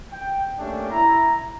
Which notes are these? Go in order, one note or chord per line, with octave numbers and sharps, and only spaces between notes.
G5
A3 A#3 C#4 D4 G4
E4 A#5